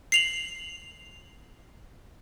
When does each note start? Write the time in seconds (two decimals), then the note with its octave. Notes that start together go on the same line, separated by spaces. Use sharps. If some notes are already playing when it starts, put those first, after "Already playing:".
0.12 C7 F7 F#7